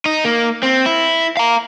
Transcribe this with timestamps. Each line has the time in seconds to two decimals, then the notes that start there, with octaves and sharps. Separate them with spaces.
0.06 D#4
0.25 A#3
0.63 C4
0.86 E4
1.37 F5 A#5